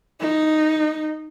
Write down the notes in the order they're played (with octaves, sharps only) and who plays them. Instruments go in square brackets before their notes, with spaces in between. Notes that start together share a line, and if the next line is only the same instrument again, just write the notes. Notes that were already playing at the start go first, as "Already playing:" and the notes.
[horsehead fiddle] D#4